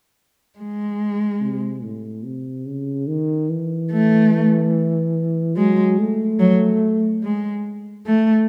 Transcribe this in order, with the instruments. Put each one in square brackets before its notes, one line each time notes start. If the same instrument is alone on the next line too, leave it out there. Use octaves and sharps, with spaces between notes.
[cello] G#3
[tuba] C3
A2
C3
C#3
D#3
E3
[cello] A3
[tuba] F#3 [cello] G#3
[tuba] A3
[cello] F#3
G#3
A3